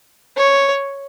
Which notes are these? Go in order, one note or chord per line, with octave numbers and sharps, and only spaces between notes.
C#5